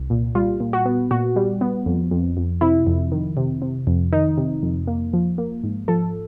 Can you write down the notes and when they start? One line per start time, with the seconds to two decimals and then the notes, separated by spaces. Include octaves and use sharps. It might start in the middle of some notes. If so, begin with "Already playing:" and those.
Already playing: C2
0.10 A#2
0.35 G3 F4
0.60 A#2
0.73 F#4
0.86 B3
1.11 A#2 F#4
1.36 G3
1.61 B3
1.86 F2
2.11 F2
2.37 F2
2.61 C3 E4
2.87 F2
3.12 D#3
3.37 C3
3.62 C3
3.87 F2
4.13 D#3 D#4
4.37 C3
4.63 F2
4.87 A#3
5.13 F3
5.38 A#3
5.64 G#2
5.88 F3 A4